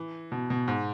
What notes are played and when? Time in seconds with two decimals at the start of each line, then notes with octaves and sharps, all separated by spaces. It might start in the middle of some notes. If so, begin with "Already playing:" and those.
Already playing: E3
0.32 B2
0.50 B2
0.68 G#2